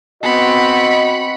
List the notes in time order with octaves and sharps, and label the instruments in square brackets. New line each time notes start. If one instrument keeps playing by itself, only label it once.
[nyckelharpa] B3 C4 [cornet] F#4 [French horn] D#5 [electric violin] B5 C#7